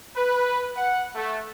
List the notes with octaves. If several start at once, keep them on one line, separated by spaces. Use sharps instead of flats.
B4
F#5
A3